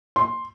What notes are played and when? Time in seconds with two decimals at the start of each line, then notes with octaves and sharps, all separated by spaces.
0.16 C6